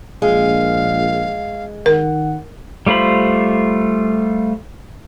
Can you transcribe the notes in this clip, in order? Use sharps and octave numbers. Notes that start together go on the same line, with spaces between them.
A#1 G#3 F5
D#3 A#4 F#5
G3 A3 F4 C5 B5